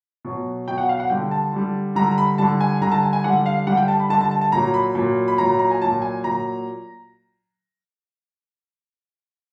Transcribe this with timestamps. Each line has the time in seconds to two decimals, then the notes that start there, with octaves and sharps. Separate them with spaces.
0.25 B2 F#3
0.68 B2 G5
0.70 F#3
0.78 F#5
0.89 F5
1.00 F#5
1.10 D3 G3 G5
1.31 A5
1.53 D3 G3
1.95 D3 G3 A#5
2.18 B5
2.38 D3 G3 A5
2.61 G#5
2.82 D3 G3 A#5
2.91 A5
3.03 G#5
3.13 G#5
3.24 D3 G3 F#5
3.46 F5
3.67 D3 G3 F#5
3.77 G5
3.88 A5
4.00 B5
4.09 D3 G3 A5
4.21 A5
4.31 A5
4.41 A5
4.52 A#2 F#3 A#5
4.74 B5
4.95 A#2 F#3
5.28 B5
5.38 A#2 F#3 A#5
5.59 A#5
5.71 G#5
5.81 A#2 F#3 A5
6.02 G#5
6.24 A#2 F#3 A#5